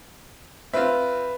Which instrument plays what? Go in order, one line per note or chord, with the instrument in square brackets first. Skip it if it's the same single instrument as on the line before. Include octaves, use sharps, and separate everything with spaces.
[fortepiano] C4 F4 [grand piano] B4 E5